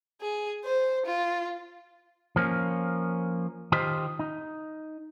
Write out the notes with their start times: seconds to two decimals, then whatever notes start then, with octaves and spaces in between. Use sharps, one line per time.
0.21 G#4
0.64 C5
1.06 F4
2.36 F3 A#3 C#4
3.72 D#3 F4 G4 C5 D#5
4.19 D#4